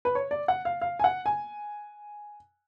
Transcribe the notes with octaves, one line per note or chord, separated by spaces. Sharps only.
B4
C#5
D5
F#5
F5
F5
G#5
F#5
G#5